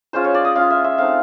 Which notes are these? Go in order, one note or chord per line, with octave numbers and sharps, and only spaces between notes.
G#3 C#4 F4 C5
C#5
D5
D#5
G#3 C#4 F4 F5
E5
E5
A3 C4 D#4 F5